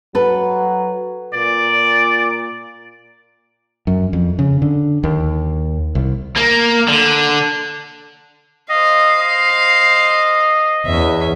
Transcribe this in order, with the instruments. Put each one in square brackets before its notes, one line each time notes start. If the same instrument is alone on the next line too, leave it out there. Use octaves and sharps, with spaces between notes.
[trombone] F#3 [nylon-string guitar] A4 B4
[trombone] A#2 [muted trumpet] D5
[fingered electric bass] F#2
F2
C#3
D3
D#2
C2
[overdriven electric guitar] A#3
D3
[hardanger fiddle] C5 F5 [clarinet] D#5
[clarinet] D#5
[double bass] E2 [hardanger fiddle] C#4 E5